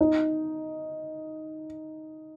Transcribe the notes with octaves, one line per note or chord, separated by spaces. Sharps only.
D#4